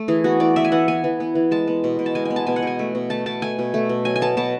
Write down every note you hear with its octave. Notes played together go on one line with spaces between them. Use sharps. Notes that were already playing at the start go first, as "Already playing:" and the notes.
Already playing: A3
E3 G#4
B3 F#4
E3 D5
B3 E5
G#5
E3 F#5
B3 G#5
E3
B3
E3
G#3 A5
B3
B2
B2
A5
G#3 G#5
B3 G#5
A5
B2 G#5
F#5
B2 G#5
A3
B2
A3 A5
B2 A5
A3 G#5
B2
A3
B2
F#3 G#5
G#5
B3 A5
B2 A5